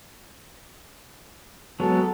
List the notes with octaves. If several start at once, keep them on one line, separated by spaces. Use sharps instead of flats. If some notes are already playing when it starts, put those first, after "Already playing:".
F#3 G#3 B3 A4